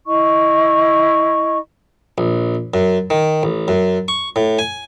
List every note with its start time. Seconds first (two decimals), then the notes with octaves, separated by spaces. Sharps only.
0.06 E4 D#5 C#6
2.18 A#1
2.74 F#2
3.10 D#3
3.43 A1
3.68 F#2
4.08 C#6
4.36 A2
4.59 G#5